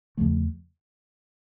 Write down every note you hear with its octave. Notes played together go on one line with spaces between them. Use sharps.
E2 C#3 F3 A3